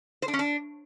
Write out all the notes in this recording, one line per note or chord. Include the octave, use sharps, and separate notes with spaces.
C5
D4
C#4
D4